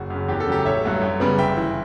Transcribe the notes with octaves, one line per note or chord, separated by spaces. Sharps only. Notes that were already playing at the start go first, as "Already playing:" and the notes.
Already playing: F#1 F#4
F#2 C#3
E2 G4
A4
C#3 F#3 A3 G4
A1 C#5 E5
G2 F#3 A3
F#2
C#3 G3 B3
G1 E5 G5
E3